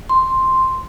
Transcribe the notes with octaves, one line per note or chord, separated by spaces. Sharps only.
C6